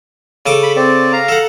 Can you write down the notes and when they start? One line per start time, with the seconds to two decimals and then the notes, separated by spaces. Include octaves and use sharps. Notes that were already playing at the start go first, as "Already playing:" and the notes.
0.46 C#3 A4 D6
0.63 B5
0.76 C4 D5
1.13 F5 A#5
1.28 A4 F#5